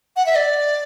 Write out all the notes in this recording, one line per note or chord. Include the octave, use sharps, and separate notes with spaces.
F#5
E5
D5